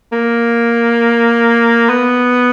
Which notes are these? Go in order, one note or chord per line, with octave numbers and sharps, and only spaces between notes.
A#3
B3